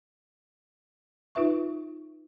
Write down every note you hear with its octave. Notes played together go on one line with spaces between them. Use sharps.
D#4 F4 B4 E5 C#6